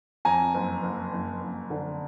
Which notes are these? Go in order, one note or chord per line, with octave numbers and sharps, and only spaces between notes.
F2 G#5 A#5
F#1
F#1
F#1
F#1
D3